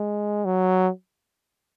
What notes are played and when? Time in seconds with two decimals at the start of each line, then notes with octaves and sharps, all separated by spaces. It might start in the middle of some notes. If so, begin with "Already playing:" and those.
Already playing: G#3
0.45 F#3